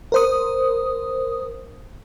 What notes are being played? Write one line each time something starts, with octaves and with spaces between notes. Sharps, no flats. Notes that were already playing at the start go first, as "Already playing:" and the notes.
A#4 C5 D#6